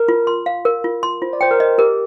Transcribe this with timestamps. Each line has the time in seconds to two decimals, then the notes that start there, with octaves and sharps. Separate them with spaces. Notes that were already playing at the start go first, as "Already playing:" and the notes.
Already playing: A#4
0.08 F4
0.27 C6
0.46 F5
0.65 A#4
0.84 F4
1.03 C6
1.22 F4 C5
1.33 D5
1.41 C5 G5
1.51 A#4
1.60 D#5
1.78 G4 A#4